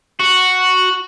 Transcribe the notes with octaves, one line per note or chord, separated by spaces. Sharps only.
F#4